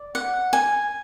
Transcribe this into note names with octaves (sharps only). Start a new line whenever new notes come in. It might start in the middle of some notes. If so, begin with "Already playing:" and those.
Already playing: D5
F#5
G#5